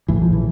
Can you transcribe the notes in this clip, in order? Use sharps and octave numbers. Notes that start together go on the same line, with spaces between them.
A#1 A2 E3
F3
E3